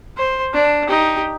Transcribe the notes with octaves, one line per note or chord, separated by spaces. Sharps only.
C5
D4
D#4 G4